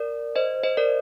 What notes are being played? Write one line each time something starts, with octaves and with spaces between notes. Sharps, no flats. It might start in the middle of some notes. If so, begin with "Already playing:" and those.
Already playing: A#4 D5
C5 D#5
C5 D#5
A#4 D5